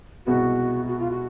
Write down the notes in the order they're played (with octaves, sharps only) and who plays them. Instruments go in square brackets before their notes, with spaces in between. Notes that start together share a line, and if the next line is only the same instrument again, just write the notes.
[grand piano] C2 B2 G#3 B3 [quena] F#4
[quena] F#4
F4
F#4